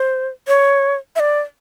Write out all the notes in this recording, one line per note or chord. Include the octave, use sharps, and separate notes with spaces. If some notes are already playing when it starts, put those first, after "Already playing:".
Already playing: C5
C#5
E5
D5